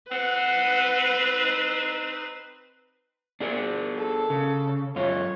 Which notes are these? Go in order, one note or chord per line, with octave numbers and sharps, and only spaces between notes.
C4 B4 F#5
D#4
D4 G#4 A#4
A4
C#3
F#2 F4 C#5